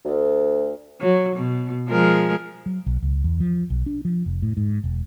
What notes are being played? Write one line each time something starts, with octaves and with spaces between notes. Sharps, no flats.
D2
F#3
B2
F3 G#3 A#4
F#3
B1
C#2
E2
F3
B1
D4
F3
F1
A2
G#2
E1